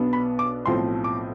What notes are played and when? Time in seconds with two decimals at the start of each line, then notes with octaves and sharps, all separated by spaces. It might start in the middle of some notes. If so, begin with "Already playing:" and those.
Already playing: B1 B2 B3 D4
0.13 B5
0.39 D6
0.66 B1 A2 F3 C4 C6
1.04 D6